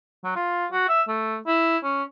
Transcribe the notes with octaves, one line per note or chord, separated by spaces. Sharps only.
F#3
F4
F#4
E5
A3
E4
C#4